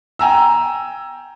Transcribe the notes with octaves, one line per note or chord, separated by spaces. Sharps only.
G5 G#5 A#5 E6